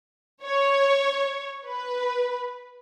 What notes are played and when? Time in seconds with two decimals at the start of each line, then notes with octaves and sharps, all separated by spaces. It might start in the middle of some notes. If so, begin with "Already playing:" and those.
0.44 C#5
1.67 B4